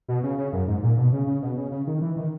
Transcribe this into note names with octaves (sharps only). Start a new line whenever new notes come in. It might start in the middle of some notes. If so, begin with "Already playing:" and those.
B2
C#3
C#3
F#2
G#2
A#2
B2
C#3
C#3
B2
C#3
C#3
D#3
E3
D#3